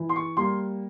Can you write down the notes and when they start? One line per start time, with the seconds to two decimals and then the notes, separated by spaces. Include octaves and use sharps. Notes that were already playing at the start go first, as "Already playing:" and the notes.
Already playing: E3
0.09 C6
0.16 C#6
0.37 G3 A#3 C6